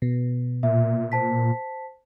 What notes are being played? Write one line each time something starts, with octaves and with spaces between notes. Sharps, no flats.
B2
A#2 E5
C5 A5 B6